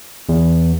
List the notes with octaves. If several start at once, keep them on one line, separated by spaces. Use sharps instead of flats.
E2